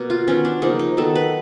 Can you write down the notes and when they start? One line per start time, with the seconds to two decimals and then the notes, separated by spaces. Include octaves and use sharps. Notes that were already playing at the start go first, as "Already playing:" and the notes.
Already playing: B2 A#3
0.10 F4
0.27 D#3 F#3 B3 C#4
0.45 D4
0.62 C#3 F3 A#3 D#4
0.79 D#4
0.97 D#3 F#3 B3 A4
1.15 B4